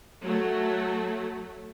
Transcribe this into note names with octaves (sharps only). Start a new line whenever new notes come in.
F#3 A3